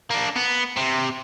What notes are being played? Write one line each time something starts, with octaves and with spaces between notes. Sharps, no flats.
A#3 D4
B3
C3